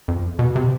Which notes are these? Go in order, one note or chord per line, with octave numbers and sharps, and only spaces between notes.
F2
B2
C3